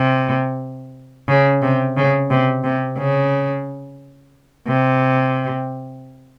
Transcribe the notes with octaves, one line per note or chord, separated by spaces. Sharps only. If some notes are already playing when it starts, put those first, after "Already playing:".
Already playing: C3
C#3
C3
C#3
C3
C3
C#3
C3